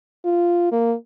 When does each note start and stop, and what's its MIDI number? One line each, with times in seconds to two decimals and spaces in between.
0.25 0.68 65
0.72 0.94 58